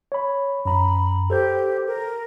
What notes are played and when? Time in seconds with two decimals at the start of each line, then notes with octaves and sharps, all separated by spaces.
0.12 C#5 B5
0.65 F#2 A#5 B5
1.30 G4 A4 C5 G6
1.87 A#4